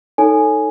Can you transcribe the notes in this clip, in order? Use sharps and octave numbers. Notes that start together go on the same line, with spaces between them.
D#4 A4 C#5 G#5